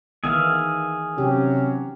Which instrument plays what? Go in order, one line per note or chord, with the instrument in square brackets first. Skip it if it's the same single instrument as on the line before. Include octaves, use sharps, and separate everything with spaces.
[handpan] D#3 E3 B3 [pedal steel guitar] G#4 E5 F5
[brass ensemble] C3 F#3 C#4 [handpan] G4